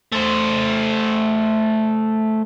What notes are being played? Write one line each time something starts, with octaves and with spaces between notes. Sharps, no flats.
A3 C5